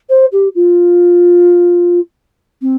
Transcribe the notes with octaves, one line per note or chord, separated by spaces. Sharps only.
C5
G4
F4
C4